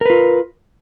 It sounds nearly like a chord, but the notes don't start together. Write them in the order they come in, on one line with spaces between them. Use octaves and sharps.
A#4 B4 F4